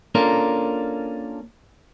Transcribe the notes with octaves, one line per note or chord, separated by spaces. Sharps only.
A#3 C#4 D4 F4 A4 A#4